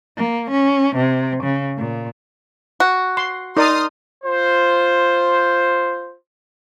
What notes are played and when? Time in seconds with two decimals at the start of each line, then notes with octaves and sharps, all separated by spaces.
0.17 A#3
0.51 C#4
0.96 C3
1.43 C#3
1.78 A#2
2.80 F#4
3.17 C6
3.57 D#4 A#4 D5 C6 D#6 F6
4.24 F4 C5